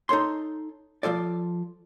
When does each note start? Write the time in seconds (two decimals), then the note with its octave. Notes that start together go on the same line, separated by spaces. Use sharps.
0.09 D#4 A4 C#5 C6
1.03 F3 F4 A4 D5